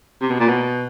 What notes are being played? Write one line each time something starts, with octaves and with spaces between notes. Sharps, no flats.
C3
B2
A#2
B2